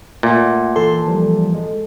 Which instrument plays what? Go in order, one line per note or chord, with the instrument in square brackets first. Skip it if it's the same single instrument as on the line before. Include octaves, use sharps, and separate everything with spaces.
[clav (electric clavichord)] A#2 [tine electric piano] A3 E5 F#5
[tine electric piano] E3 A5 C6 [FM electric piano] A4
[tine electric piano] E3 F3 G3
G#3